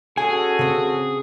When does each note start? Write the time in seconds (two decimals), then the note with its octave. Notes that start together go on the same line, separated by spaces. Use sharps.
0.17 C#4 F#4 G#4 A4 G#5
0.59 C#3 C4